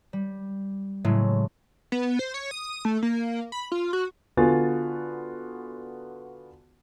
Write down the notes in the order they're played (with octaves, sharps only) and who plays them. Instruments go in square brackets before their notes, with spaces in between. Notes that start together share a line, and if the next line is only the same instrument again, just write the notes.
[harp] G3
A2 C#3 F#3 G#3 A3
[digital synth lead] B3
C5
C#5
D#6
A3
A#3
B5
F4
F#4
[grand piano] D3 B3 F4 F#4 G#5 A6